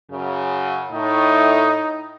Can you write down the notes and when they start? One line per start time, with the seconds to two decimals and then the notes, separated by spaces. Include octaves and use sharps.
0.10 F#2 C#3
0.91 A2 D#4